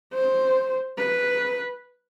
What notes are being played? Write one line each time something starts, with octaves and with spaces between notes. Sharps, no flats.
C5
B4